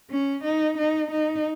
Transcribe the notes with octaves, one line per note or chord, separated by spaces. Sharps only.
C#4
D#4
D#4
D#4